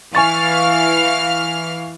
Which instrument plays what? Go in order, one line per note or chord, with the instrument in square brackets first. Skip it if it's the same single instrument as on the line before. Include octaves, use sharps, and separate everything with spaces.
[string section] E3 F5 F6 [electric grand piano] G#5 C#6 A6